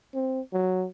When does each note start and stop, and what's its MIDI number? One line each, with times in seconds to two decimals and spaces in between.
0.14 0.41 60
0.53 0.86 54